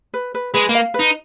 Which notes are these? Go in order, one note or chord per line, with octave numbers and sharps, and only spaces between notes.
B4
B4
G#3 B4
A#3
F5
B4
D#4